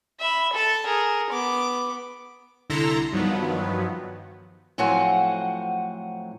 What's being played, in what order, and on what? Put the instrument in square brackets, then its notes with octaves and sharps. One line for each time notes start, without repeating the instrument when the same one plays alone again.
[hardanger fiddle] E5 B5
A4 A5
G#4 A#4
B3 D6
[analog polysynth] C2 D3 E4 A4 A#5 C6
G2 D#3 F3 F#3 B3
[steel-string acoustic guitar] A2 F3 F#3 C4 F#5 G#5